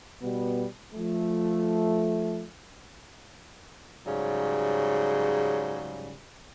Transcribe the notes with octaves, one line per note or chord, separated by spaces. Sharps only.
B2 G3 B3
F3 A3
G#2 C#3 F#3 G3